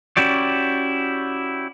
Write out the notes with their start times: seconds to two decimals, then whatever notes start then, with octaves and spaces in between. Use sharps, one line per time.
0.17 C#4 E4 F#4 G4 D5